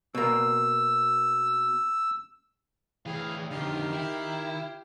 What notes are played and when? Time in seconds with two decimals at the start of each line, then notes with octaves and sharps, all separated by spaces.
0.15 B2 A#3 E6
3.06 A2 E3 G#4 F5 G5
3.51 F2 D3 D#3 G4 F5
3.93 E4 G5